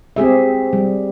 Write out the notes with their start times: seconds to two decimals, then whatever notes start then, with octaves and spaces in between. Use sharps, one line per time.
0.16 C4 G4 G#4 E5
0.73 G3